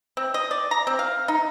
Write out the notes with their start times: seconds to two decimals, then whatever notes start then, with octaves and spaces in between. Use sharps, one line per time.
0.17 C4
0.34 D#5
0.51 D5
0.71 A#5
0.87 C4
0.99 F5
1.28 D#4